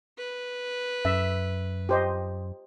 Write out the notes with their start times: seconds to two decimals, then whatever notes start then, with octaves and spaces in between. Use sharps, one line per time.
0.18 B4
1.05 F#2 E5
1.89 G4 C5 D#5